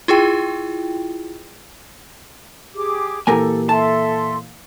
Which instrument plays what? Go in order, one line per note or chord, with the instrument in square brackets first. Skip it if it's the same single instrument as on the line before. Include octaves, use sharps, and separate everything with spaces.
[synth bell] E4 F4 G#4 G5
[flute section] G4 G#4 D6
[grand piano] A#2 E3 [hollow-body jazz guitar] G4 A#4 G#5 [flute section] A4
[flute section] A4 E5 C6 [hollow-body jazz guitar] A5